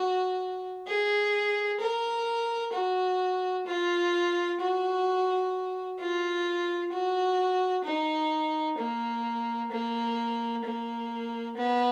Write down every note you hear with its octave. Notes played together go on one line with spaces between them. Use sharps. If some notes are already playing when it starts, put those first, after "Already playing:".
Already playing: F#4
G#4
A#4
F#4
F4
F#4
F4
F#4
D#4
A#3
A#3
A#3
B3